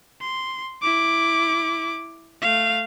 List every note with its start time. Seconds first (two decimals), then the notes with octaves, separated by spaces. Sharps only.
0.21 C6
0.82 E4 D6
2.42 A3 F5